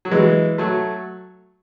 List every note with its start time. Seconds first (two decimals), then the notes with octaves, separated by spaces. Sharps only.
0.05 F#3
0.11 E3 G#3
0.58 F#3 A3